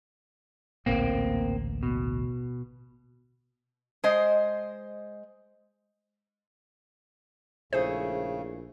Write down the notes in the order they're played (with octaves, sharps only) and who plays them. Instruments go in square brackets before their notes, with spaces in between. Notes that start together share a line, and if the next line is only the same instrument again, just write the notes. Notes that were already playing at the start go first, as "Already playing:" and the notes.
[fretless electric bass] A1 D2 A#2 [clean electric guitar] A#3 C4
[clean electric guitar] B2
[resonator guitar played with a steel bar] G#3 C5 D#5
[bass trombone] A#1 [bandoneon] C#3 [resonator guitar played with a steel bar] A3 E4 G#4 [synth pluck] C5